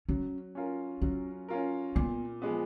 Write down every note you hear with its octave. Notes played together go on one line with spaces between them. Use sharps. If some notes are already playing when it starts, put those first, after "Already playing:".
F#3 C#4
C#4 F4 A#4
F#3 C#4
C#4 F4 A#4
A#2 B3
F3 G#3 B3